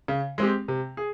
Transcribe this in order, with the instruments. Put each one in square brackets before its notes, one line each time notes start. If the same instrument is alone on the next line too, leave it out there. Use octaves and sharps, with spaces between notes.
[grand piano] C#3
G#3 C4 G4
C3
G#4